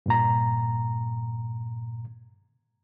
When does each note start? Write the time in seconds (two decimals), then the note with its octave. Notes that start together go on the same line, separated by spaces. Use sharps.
0.06 G2 A#2 A#5